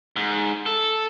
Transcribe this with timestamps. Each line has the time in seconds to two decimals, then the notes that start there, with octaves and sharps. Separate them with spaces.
0.16 G#2
0.66 A4